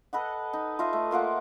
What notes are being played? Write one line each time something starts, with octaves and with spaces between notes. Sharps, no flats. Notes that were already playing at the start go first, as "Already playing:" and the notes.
A4 B4 D#5 F#5
D#4
F4 A4 D#5 E5
A3
A#3 F4 A#4 F#5